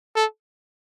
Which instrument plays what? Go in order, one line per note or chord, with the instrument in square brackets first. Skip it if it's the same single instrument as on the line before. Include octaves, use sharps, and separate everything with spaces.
[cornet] A4